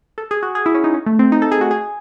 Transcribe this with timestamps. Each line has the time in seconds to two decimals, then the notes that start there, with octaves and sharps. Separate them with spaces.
0.18 A4
0.31 G#4
0.43 F#4
0.55 G#4
0.66 E4
0.75 C#4
0.84 D#4
0.94 C#4
1.06 A3
1.19 C4
1.32 D#4
1.42 A4
1.52 G#4
1.61 F#4
1.71 G#4